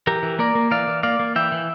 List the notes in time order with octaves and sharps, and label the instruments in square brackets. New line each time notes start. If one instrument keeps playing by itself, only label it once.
[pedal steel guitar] E3 G4 A#4
E3
A#3 A#4 D5
A#3
E3 D5 F5
E3
A#3 D5 F5
A#3
E3 E5 G5
E3